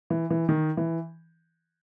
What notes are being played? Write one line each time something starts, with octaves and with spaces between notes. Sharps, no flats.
E3
E3
D#3
E3